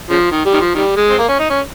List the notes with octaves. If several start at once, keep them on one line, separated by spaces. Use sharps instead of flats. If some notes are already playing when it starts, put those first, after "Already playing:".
C#3 F3
D#3
G3
D#3
F3
D#3 G3
G#3
C4
A#3
C#4
D#4
C#4